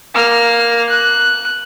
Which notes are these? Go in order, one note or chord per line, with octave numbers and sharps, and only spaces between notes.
A#3 F6
F#6